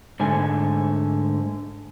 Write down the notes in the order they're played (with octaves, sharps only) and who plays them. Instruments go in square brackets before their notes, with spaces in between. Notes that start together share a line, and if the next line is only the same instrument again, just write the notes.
[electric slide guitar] G#2 D3 A3 G#5